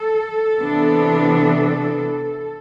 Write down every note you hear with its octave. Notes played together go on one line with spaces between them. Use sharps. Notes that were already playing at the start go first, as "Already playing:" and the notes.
Already playing: A4
C3 E3 B3 D4